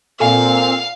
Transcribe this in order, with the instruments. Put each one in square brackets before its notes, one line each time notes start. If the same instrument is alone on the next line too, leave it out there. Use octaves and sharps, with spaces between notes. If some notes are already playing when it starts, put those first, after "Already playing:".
[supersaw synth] A#2 [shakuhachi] C4 [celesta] A4 G#5 [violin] F5